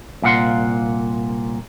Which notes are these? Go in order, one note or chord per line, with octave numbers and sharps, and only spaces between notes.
C2 A#2 F5 F#5 C6